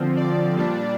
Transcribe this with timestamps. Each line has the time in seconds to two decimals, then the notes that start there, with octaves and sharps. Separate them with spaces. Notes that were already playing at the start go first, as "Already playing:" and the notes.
Already playing: D3 F3 C4
0.17 D5
0.56 A#2 G3 D4